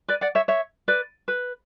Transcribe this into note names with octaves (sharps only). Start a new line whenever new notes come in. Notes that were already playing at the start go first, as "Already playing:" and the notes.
B4 D5
D5 F#5
C#5 E5
C#5 E5
B4 D5
B4